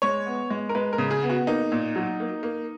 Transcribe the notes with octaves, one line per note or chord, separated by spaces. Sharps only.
G#3 C#5
B3
G#3
A#4
G#3 B4
A#4
C#3
G#4
B3
F#4
A#3 D#4
A#2
F#3
A#3
A#3